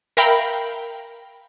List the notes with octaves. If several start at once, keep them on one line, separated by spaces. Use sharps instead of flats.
A#4 E5 F5 G5 B5